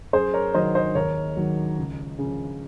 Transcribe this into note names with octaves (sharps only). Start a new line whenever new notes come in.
F#2 G#4 C5
A#4 C#5
D#3 F#3 C5 D#5
C5 D#5
D#2 A#4 C#5
D#3 F#3
C#2
C#3 F3